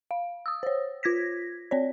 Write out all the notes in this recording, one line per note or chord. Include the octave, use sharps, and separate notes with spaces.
F5
D#6 E6
C5 C#5
F4 G#6 A#6 B6
C4 C#5 D5